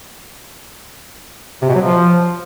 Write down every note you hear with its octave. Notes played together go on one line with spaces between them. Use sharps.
C3
B2
F#3
F3